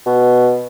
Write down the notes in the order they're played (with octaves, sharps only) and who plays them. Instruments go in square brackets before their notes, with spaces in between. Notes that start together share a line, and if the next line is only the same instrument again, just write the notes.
[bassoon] B2